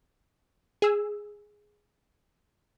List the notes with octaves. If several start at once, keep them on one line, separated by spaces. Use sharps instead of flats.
G#4 E6